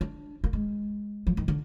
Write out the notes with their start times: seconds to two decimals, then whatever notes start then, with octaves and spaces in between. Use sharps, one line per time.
0.01 D4
0.44 A#3
0.53 G#3
1.27 F3
1.37 D#3
1.48 D3